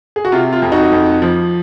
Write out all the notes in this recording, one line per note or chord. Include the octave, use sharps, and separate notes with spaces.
G#4
F#4
C3 F4
F4
F2
D#4 F#4
F2
F3